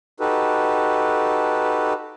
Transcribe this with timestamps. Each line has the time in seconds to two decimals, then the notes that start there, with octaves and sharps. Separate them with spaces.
0.20 D#4 F#4 G4 A4 B4